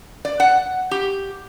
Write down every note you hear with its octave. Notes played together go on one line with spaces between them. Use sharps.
D5
F#5
G4